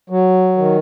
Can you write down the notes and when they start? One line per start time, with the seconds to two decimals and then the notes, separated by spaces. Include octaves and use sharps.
0.10 F#3
0.57 D#3